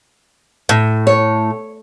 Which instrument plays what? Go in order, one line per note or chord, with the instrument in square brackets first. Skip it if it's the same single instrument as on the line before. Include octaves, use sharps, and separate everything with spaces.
[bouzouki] A2
[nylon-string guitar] C#5